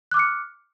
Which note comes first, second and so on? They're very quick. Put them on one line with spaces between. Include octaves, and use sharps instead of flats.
F#6 D6 F6 C#7